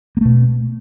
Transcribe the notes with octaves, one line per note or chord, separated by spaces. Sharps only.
B2 A3 A#3